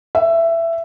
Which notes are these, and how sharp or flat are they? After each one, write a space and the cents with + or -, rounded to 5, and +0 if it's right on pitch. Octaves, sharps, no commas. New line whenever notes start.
E5 +15